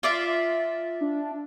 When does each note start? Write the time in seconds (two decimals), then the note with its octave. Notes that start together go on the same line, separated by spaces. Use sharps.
0.03 F4 D5 E5
1.01 D4